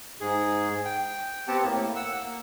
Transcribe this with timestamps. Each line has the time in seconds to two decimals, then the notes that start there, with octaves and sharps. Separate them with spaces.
0.21 G#2 G#4
0.85 G5
1.48 B3 C4 G4 F#5 A5
1.64 A2 A#3
1.96 F#5 E6
2.23 A#3